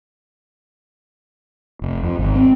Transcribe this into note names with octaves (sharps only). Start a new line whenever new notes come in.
F1
F2
G#1
C4